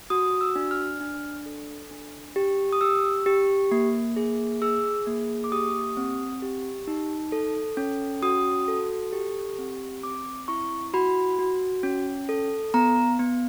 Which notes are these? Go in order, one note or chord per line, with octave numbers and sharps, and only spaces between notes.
F#4 D#6
E6
D4
F6
D4
A4
D4
G4
D#6
G4 E6
G4
A#3
G#4
G#4 E6
A#3
D6
G4 D#6
C4
G4
D#4
A4
C#4
F#4 D#6
A4
G4
C4
C4 D6
E4 C#6
F#4 B5
F#4
C#4
A4
B3 A#5
B3